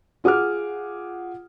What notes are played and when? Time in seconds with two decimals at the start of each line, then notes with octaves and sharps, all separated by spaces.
0.24 F4 G#4 F#5 D6 F6